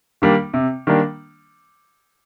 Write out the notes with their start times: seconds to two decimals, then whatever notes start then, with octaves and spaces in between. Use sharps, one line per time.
0.22 D#3 G3 A#3 D4
0.54 C3
0.87 D#3 G3 A#3 D4